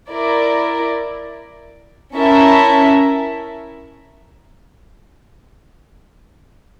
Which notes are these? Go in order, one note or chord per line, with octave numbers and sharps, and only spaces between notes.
E4 A#4 D5
C#4 E4 A#4 E5 A5